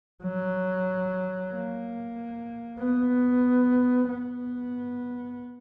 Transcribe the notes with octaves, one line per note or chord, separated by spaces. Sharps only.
F#3
A#3
B3
B3